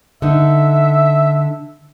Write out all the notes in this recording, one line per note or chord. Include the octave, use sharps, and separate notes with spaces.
D3 D#4 E5